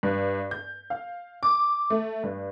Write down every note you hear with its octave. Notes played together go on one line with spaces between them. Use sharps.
G2
G6
F5
D6
A3
G2